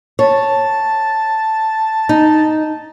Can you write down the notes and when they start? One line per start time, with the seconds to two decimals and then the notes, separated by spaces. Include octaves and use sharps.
0.19 C#5 A5
2.09 D#4